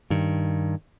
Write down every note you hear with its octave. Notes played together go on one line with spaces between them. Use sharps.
G2 D#3